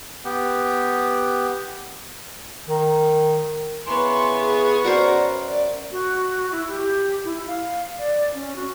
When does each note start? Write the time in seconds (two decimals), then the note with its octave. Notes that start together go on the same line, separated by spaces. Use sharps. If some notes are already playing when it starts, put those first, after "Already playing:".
0.25 B3 G4
2.68 D#3
3.86 C#3 B3 E4 G#5 C6 C#6
4.41 G#4
4.84 F#2 F#4 A#4 C5 D5
5.48 D5
5.91 F#4
6.52 E4
6.68 G4
7.25 E4
7.47 F5
7.98 D5
8.34 C#4
8.56 F#4